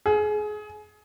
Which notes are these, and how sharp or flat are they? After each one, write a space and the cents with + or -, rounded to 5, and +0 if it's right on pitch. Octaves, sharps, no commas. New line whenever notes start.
G#4 +25